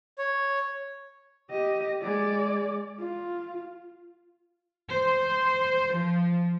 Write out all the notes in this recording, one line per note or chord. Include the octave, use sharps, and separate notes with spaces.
C#5
G4 D#5
G#3 D5
F4
C5
F3